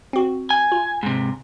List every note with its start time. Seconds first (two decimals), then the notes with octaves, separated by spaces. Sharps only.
0.13 C4 F#4
0.50 G#5
0.72 F4
1.03 G#2 C3